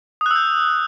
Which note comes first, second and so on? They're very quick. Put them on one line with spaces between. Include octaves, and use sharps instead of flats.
D#6 F#6 E6 G6